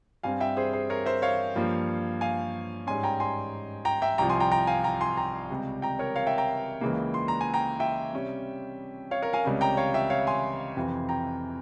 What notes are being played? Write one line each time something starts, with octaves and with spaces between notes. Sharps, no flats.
G2 G3 C4 F5 G#5
E5 G5
G#4 C5
G#4 C5
A#4 C#5
C5 E5
C#5 F5
G2 F3 A#3
F5 G#5
G#2 G3 C#4 G#5 C6
G5 A#5
G#5 C6
G5 A#5
E5 G5
C2 C3 F3 G5 A#5
G#5 C6
G5 A#5
G5 A#5
F5 G#5
G5 A#5
G#5 C6
G5 A#5
C#2 C3 G3
G5 A#5
A#4 C#5
C#5 F5
E5 G5
G5 A#5
C#2 C#3 E3 A#3
C6
A#5
G#5
G5 A#5
E5 G5
C3 G3 C#4
C#5 F5
A#4 C#5
F5 G#5
C#2 C3 G3 C#4
G5 A#5
C#5 F5
E5 G5
C#5 F5
G#5 C6
F2 C3 E3
G5 A#5